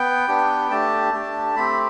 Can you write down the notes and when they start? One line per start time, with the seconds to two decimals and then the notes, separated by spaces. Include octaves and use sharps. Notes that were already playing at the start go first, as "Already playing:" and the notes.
Already playing: B3 G5
0.28 B3 D4 G4
0.71 A3 D4 G4 A5
1.13 A3 D4 G4
1.55 A3 C4 G4 B5